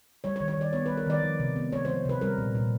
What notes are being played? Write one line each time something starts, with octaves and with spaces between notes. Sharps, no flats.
G3 C#5
C#5
D#3
C#5
D#3 D5
B3 C#5
G3 B4
A#4
D#3 D5
F3
C3
B3
G#3 C#5
F3 C5
C3 B4
G3 A#4
A#2
A#2